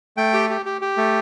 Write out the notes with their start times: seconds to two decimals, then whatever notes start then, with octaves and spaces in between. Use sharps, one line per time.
0.17 A3 G5
0.33 G4
0.50 G4
0.66 G4
0.81 G4
0.97 A3